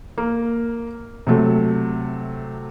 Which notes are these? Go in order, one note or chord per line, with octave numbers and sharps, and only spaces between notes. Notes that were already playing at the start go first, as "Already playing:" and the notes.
A#3
C3 F#3 A3